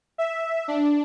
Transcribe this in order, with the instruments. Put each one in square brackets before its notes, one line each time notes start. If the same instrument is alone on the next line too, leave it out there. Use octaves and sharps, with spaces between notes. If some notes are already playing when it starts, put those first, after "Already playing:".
[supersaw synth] E5
D4